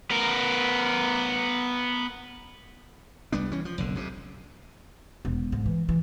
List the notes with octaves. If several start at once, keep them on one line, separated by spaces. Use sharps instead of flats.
B3 A#4
C2 G3 B3 D4
E3 C#4
F3
F#1 B1 D3
F2 C3
E1
G#2
E3
E3